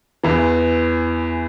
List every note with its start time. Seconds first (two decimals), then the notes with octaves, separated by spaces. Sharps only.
0.23 E2 E3